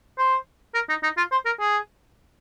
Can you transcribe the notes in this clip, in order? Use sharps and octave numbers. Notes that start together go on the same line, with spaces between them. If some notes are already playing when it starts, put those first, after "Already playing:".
C5
A#4
D#4
D#4
F4
C5
A#4
G#4